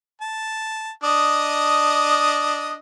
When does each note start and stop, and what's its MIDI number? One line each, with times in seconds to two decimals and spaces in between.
0.21 0.90 81
1.04 2.76 62
1.04 2.76 75
1.04 2.76 87